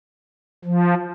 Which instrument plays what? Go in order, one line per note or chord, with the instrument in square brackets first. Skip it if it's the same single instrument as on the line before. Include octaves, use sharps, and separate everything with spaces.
[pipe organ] F3